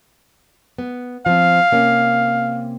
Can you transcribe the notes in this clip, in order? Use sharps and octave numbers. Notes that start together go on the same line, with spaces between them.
B3
F3 C4 F5
C3 A#3 C#4